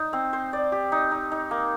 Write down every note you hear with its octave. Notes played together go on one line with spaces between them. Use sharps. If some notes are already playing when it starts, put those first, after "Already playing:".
Already playing: D#4
C4
C5
D5
G4
D#4
D#4
D#4
A#3